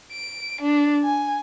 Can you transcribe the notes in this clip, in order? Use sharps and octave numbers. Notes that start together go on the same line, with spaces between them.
D7
D4
G#5